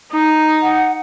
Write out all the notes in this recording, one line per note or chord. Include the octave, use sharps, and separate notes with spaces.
D#4
F#5